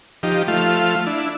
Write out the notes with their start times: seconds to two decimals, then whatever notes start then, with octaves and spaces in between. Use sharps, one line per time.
0.23 F3 D#4 G4
0.48 F3 A3 F4
1.07 D4 E4